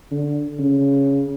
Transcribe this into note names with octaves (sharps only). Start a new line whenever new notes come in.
D3
C#3